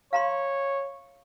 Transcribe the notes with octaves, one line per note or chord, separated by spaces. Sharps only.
C#5 F5 A#5 C6